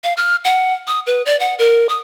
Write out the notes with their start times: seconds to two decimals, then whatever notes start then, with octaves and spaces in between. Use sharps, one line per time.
0.04 F5
0.17 F6
0.45 F#5
0.87 D#6
1.07 B4
1.26 D5
1.40 F#5
1.59 A#4
1.89 D#6